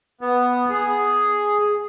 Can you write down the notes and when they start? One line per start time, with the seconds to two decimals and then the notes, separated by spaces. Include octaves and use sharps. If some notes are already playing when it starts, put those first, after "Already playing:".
0.21 B3
0.69 G#4